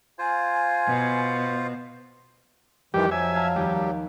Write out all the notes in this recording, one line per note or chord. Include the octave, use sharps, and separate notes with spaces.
F4 C5 F5 G#5
B2
F2 D#3 E3 G3 G4
F#3 E5 G#5
F5 A5 A#5
D#2 G3 D#5 G5